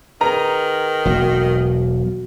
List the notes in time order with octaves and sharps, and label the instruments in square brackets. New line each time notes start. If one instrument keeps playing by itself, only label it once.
[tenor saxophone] D#3 [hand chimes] G#4 B4 [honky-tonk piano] A#5
[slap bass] E1 B1 A#3 [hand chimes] F#4